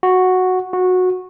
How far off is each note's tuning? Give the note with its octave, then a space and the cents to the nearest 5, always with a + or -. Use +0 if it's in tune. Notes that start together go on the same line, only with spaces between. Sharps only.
F#4 -5
F#4 -15